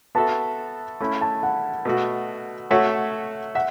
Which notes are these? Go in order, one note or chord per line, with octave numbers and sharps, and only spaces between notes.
B3 F#4 A4 E5 A5
A3 C#4 E4 B5
A5
F#5
B2 A3 F#4
A3 F#4 C#5 E5 F#5
E5 F#5